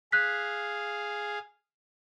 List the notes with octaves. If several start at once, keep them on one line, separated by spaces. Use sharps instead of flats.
G#4 F5 F#6 B6